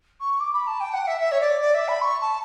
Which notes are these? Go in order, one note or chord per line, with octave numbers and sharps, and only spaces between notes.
C#6
D6
B5
A5
G5
F#5
E5
E5
C#5
D5
D5
E5
B5
C#6
A5